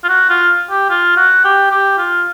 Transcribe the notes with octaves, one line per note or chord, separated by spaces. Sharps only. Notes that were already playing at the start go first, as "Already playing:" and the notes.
F4
F#4
F4
G4
F4
F#4
G4
G4
F4